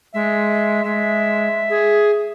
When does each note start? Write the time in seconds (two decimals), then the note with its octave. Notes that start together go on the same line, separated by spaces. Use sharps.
0.14 G#3 E5
0.84 G#3 E5
1.70 G#4